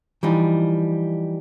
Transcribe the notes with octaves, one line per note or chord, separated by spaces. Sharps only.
E3 F3 G3 D#4